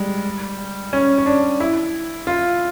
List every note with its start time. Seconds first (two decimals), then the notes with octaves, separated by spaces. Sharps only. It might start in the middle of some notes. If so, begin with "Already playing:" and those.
Already playing: G3 G#3
0.93 C#4
1.18 C#4
1.26 D4
1.60 E4
2.27 F4